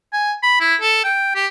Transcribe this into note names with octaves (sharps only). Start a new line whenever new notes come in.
G#5
B5
E4
A4
G5
G4